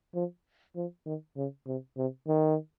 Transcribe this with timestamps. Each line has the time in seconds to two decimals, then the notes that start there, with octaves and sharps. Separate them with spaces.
0.15 F3
0.76 F3
1.06 D#3
1.37 C#3
1.67 C3
1.97 C3
2.28 D#3